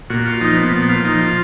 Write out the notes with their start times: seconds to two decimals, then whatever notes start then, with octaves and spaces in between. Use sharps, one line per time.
0.10 A#2 F#4
0.25 F4
0.41 F3 D#4
0.56 B3
0.73 A#2 B3
0.89 F4
1.05 F3 D#4
1.21 F4